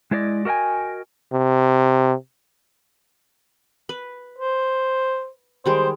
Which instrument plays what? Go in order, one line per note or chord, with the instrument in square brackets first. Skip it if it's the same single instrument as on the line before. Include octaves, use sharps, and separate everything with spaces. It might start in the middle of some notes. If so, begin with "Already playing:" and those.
[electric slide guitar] G#3 E4 C5 D5 D#5
F#4 A#4 D#5 G5 G#5
[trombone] C3
[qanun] B4
[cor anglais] C5
[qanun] D#3 G3 G#3 [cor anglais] C5